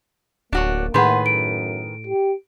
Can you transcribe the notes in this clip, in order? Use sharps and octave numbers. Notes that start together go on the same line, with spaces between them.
D1 A#3 D4 F#4 C#5
A2 D#3 G#4 B4 F#5 C6
F#2 D7
G4